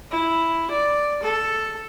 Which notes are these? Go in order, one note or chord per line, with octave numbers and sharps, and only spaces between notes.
E4
D5
A4